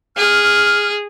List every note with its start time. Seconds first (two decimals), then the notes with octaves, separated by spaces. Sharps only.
0.17 G#4 F6